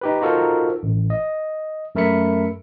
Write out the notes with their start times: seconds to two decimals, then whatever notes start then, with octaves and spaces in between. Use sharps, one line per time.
0.01 D#4 G4 B4
0.21 D#4 F4 F#4 A4 A#4 C5
0.83 A1
1.10 D#5
1.95 F#2 A3 A#4 E5 B5 C#7